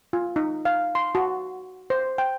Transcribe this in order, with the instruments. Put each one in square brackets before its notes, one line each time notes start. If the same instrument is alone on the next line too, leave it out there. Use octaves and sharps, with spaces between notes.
[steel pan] F4
D#4
F5
C6
F#4
C5
G5